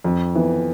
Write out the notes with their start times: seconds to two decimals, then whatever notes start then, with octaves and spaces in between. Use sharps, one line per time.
0.04 F2
0.35 E3 B3